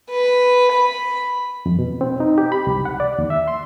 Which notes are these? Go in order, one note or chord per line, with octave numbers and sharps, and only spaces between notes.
B4
B5
F2
B2
C4
D#4
G4
B5
C2
F#5
D5
D#2
E5
C6